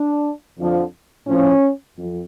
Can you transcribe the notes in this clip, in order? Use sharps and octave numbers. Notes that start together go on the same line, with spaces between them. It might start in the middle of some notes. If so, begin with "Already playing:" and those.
Already playing: D4
F2 D3 F3
A2 F3 C#4
F2